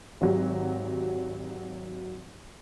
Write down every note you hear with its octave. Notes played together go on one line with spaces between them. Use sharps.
G#1 F#3 G4